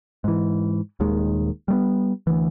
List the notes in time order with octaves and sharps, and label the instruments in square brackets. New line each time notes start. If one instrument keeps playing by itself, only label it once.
[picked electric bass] G#2 E3
D#1 D#2 D#3 G#3
G3 A3 B3
D2 E3